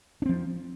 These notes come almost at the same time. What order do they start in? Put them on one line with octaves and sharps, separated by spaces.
D4 C4 F3